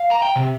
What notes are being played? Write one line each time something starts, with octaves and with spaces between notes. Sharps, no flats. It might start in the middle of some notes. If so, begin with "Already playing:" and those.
Already playing: F5
A#5
G5
C3